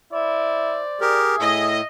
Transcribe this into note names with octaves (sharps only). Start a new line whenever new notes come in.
E4 C5 D5
G4 G#4 A#4
A2 D#5 E5